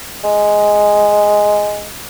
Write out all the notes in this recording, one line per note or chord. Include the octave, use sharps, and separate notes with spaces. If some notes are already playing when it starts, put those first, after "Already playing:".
G#3